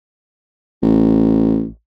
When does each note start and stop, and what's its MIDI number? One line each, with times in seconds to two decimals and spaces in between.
0.82 1.67 33